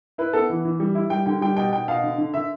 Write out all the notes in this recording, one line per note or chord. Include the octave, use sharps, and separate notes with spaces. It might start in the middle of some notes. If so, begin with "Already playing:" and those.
E4 B4
B3 A4
E3
E3
G3
E4
G3 G5
D3 G5
G3 G5
B2 G5
B2 G5
B2 F5
D3
D3
D3 E5